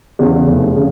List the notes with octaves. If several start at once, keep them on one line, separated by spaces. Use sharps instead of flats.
E2 C#3
F1
C#3